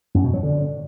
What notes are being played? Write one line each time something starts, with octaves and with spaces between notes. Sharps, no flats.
F#2
B2
F#3
D3